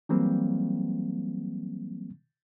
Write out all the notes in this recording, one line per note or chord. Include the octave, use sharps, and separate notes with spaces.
E3 F#3 G3 A#3 C4